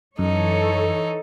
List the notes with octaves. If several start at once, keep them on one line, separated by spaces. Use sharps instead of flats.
F#2 E3 D#4 A4 C#5